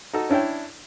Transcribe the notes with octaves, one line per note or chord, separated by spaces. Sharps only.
D#4 F#4 A4
C#4 D4 E4 C#5 G5